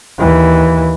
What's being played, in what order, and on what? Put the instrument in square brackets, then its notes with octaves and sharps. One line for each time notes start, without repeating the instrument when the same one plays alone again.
[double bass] D#2 E3